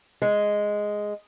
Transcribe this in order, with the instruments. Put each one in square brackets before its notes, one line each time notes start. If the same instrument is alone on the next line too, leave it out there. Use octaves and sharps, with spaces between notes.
[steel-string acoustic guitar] G#3